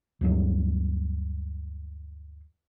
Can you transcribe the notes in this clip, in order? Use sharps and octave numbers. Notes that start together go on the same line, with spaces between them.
D2 G2 F#3 G3